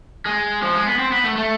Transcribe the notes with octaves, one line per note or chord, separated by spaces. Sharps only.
G#3
F3
G#3
B3
C4
B3
A3
A3